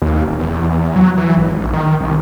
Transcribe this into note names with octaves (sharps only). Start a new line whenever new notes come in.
D#2
D#1
E2
F#3
E3
G#1
A#1
D#3
C2